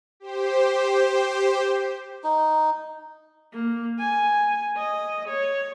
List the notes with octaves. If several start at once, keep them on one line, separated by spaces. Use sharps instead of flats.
G4 C5
D#4
A#3
G#5
D#5
C#5